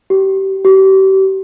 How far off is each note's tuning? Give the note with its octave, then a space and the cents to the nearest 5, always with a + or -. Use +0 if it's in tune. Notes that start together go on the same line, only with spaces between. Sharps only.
G4 -25
G4 -35